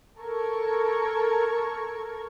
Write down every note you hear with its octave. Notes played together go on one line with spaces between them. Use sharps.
A4 A#4 C#6 G#6